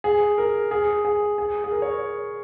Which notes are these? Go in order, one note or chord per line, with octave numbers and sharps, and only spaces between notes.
G#4
A#4
G#4
G#4
G#4
G#4
A#4
C#5